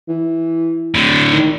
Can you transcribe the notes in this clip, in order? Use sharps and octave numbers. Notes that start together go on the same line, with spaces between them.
E3
D1 A2 D3
D#3